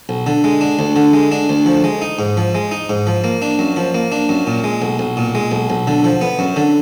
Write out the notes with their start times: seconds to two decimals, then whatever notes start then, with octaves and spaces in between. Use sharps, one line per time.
0.09 B1
0.27 D3
0.44 G#3
0.61 D4
0.79 D2
0.96 D3
1.13 G#3
1.32 D4
1.49 D2
1.66 F3
1.84 G#3
2.02 D#4
2.19 G#2
2.37 F3
2.55 G#3
2.71 D#4
2.89 G#2
3.07 F3
3.24 A#3
3.42 D4
3.59 F#2
3.77 F3
3.95 A#3
4.12 D4
4.29 F#2
4.47 A#2
4.64 G#3
4.82 B1
4.99 B1
5.17 A#2
5.35 G#3
5.52 B1
5.70 B1
5.87 D3
6.04 F3
6.21 B3
6.39 F#2
6.56 D3